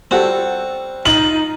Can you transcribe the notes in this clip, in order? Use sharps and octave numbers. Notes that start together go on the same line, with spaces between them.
G3 C4 F#4 A4
D#4 F4 F#7